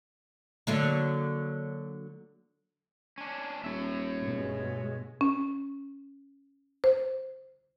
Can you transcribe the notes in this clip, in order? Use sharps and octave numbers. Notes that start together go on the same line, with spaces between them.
D3 F#3 A#3
C#4 D4
D#1 C#5 E5
G2 B2 G#3
C#4
C5